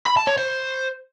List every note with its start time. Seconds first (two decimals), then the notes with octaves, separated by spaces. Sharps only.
0.06 B5
0.17 A5
0.27 C#5
0.38 C5